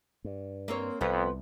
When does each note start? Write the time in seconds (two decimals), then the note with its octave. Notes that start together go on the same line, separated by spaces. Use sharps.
0.24 G2
0.68 A#3 C4 C#5
1.01 C2 F2 F3 B3 F4